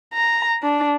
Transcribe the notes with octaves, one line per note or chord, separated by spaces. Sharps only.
A#5
D4